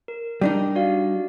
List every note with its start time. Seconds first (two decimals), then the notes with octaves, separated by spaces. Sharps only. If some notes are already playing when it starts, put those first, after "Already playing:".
0.08 A#4
0.41 G3 D4 D#4
0.76 F#4 D5 F5